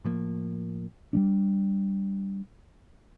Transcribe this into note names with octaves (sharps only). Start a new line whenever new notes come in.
A2 F3 A#3
G3 A3 D4